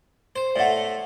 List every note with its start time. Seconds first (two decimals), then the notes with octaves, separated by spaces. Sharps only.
0.36 C5
0.56 A2 A3 D5 F#5